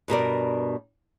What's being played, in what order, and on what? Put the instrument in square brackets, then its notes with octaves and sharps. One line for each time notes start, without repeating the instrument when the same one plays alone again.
[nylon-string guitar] G2 B2 A#4 D5